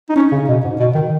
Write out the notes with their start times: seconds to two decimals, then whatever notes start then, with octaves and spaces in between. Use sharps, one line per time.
0.09 D#4
0.16 C#4
0.32 C#3
0.48 B2
0.64 G#2
0.80 B2
0.95 D#3